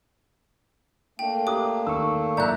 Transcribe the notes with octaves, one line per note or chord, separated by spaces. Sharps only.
A3 A#3 D4 G5
G4 A#5 D6 D#6
D#3 C#6 E6
F#1 A#2 D5 E5 A#5 F#6 G6 C#7